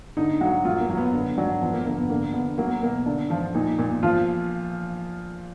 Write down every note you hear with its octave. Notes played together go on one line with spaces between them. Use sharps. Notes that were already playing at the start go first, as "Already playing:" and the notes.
D3 D#4
F#3 F#4
F#3 F4
A#3
F#3
B3
D3 B3
F#3 D4
F3 B3
A#3
D3 A#3
B3
D3 A#3
D3 B3
B3
F#3 A#3
B2 A#3
D3 D4
F3 F4
A#2 D#4
A#2
F3 F4